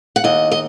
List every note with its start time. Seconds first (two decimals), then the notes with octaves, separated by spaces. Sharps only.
0.16 F#5
0.24 D#2 D#5
0.52 D#5